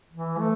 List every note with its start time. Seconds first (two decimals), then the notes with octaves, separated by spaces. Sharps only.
0.13 E3
0.39 A3